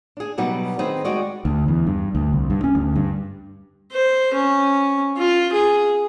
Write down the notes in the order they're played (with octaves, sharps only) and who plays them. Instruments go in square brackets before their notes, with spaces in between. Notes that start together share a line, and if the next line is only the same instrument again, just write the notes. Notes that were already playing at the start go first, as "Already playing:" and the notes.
[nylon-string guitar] D4 G#4
B2 F#3 G3 B3 D#4
D#3 C4 D#4 G#4 B4
G3 G#3 F#4 D5 D#5
[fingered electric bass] D2
E2
G2
D2
C2
G2
C#4
D2
G2
[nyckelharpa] C5
C#4
F4
G#4